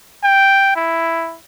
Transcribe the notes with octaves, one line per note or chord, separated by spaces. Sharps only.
G5
E4